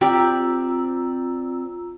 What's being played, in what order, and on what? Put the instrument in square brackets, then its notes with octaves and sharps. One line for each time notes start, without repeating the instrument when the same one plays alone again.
[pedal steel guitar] C4 D5 [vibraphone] F4 A#5 E6 [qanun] G4